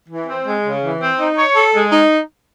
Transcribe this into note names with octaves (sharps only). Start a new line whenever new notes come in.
E3
C4
G#3
C#3
E3
C4
D#4
C#5
A4
G#3
D#4